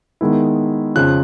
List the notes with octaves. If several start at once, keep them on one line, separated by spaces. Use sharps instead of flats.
D#3 G#3 B3 E4
F2 C#3 F3 F#6